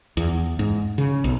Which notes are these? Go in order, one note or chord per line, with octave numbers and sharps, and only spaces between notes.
E2
G#2
C#3
B1